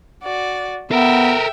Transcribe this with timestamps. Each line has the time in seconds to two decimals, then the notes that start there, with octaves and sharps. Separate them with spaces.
0.23 F#4 D5
0.91 B3 A4 A#4 E5 G5